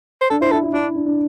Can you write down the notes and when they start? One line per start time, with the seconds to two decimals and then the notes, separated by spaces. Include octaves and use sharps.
0.21 C5
0.30 D4 A4
0.41 E4 C5
0.51 E4 A4
0.63 E4
0.73 D4 E4
0.95 D4
1.06 D4